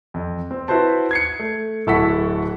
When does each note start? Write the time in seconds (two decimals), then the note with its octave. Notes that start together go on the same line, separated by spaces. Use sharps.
0.14 F2
0.51 C4
0.68 E4 F#4 B4 C5 A5
1.11 G#6 C7 C#7
1.39 A3
1.87 D1 E4 A4 F#5 C#6 B6